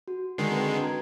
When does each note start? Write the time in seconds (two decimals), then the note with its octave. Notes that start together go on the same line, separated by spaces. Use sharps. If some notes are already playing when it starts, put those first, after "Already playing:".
0.08 F#4
0.38 D3 D#3 G#3 C7
0.51 C4 B4 G5
0.81 F#4 A#5 G#6